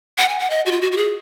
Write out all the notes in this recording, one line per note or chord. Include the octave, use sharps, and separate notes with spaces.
F#5
G#5
F#5
D#5
F#4
F4
F#4
F#4
G#4